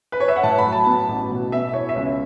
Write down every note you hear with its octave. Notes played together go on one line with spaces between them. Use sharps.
B4
C#5
E5
F#5
A2 A5
B5
F#3
A5
B3
A1
B2
B3 E5
E4 C#5
E5
C#2